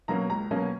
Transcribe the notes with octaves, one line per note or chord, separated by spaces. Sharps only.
B2 F#3 A#3 C#4 A#5
C#2 A#5
B2 F#3 A#3 C#4